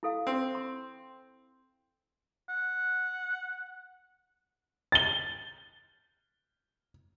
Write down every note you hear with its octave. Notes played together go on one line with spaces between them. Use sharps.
E4 A4 F5
C4
C6
F#5
A6 G7